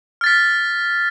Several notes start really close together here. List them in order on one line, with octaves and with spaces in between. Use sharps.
F6 A6 B6